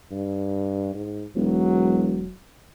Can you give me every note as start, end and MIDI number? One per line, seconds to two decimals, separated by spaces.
0.11 0.89 43
0.94 1.26 44
1.36 2.29 28
1.36 2.33 54